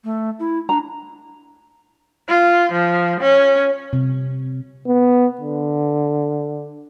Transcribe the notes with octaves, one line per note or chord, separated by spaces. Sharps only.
A3
E4
D4 A#5
F4
F3
C#4
C3
B3
D3